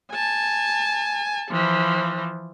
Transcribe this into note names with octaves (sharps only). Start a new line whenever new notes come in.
G#5 A5
E3 F3